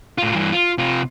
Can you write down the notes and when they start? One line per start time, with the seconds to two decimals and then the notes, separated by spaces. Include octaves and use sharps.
0.18 A2 F4
0.35 G2 E3
0.52 F4
0.78 C3 F4